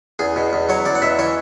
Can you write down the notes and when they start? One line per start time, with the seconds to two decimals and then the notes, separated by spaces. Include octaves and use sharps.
0.19 E2 G#4
0.36 B2
0.53 E2
0.69 F#3 C#5
0.85 E2 D5
0.95 F#5
1.02 B2 E5
1.19 E3 C#5